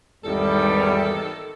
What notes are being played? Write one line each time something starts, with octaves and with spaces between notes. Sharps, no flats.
G#1 E2 D#3 G3 A4